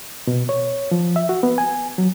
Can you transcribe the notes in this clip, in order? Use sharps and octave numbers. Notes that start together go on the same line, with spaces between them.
B2
C#5
F3
E5
F#4
B3
G#5
F#3